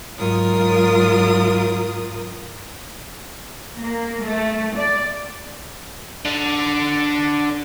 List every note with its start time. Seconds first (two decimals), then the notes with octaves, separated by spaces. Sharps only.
0.18 G#2 F#3 F4 A#4 D#6
3.78 A#3
4.24 A3
4.76 D5
6.25 D3